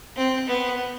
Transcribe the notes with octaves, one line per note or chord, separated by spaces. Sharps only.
C4
B3